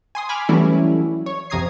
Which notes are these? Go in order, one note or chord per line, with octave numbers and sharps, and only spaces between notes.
G#5 C6 D#6
G#5 B5 D6 F6
E3 F#3 G3 A3 C#4 E4
C#5
F2 C3 A#5 D#6 G#6 C7